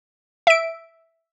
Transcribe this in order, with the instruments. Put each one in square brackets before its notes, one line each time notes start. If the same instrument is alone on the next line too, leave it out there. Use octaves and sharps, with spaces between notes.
[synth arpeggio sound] E5 D7